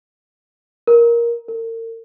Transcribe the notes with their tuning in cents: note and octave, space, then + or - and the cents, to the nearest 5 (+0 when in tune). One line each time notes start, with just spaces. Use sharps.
A#4 +10
A#4 -40